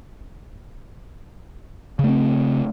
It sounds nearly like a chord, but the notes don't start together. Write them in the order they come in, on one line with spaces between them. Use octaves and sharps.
C#3 A3 C4